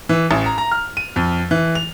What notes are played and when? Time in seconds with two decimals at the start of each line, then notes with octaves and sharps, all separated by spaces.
0.09 E3
0.31 A1
0.46 A#5
0.58 A#5
0.72 F6
0.97 D#7
1.16 F2
1.51 E3
1.75 F7